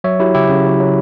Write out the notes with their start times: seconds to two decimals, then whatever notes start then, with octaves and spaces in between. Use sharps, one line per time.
0.04 F#3 C#5 E5
0.19 F#3 E4 G4
0.34 C#3 E4 G4
0.50 C#3 F#4
0.65 F#3
0.80 F#3